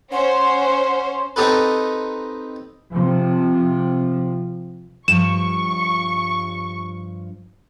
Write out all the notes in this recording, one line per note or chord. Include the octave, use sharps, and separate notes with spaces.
C#4 C5 F#5
C4 D#4 G4 A4 B4
C3 F3
G2 F3 G4 C#6 E7